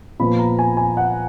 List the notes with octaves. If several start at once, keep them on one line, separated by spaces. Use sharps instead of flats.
A#2 F3 B3 B5
A#5
G#5
G#5
F#5